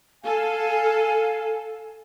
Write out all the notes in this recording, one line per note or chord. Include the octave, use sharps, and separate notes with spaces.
A4 F5 G#5